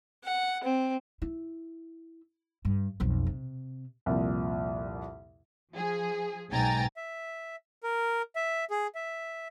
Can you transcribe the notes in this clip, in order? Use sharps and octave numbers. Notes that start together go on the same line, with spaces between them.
F#5
C4
E4
G2
B1 F2
C3
C2 F2 A#2
F3 G#4
B1 G#2 G5 G#5 A#5 A6
E5
A#4
E5
G#4
E5